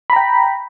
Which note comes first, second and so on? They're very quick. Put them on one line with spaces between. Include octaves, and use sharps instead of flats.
B5 A#5 G5